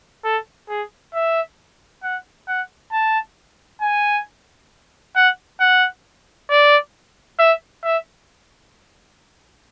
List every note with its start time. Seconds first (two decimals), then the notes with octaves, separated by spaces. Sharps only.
0.25 A4
0.69 G#4
1.14 E5
2.03 F#5
2.48 F#5
2.92 A5
3.82 G#5
5.16 F#5
5.60 F#5
6.50 D5
7.39 E5
7.84 E5